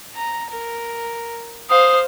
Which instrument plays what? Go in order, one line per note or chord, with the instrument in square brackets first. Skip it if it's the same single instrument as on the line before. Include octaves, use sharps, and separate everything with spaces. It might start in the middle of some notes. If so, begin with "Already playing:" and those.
[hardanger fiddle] A#5
A#4
[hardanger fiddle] C5 F5 [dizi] D#6